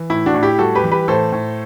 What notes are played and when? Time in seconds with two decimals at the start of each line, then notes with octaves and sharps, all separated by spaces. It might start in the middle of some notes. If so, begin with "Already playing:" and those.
Already playing: E3
0.10 A2 E4
0.26 D4 F#4
0.34 A2
0.43 E4 G4
0.59 G3 F#4 A4
0.75 G4 B4
0.84 E3
0.92 G4 B4
1.08 A2 A4 C5
1.32 A2